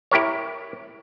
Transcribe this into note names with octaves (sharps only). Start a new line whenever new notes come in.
E4 G4 A#4 C#5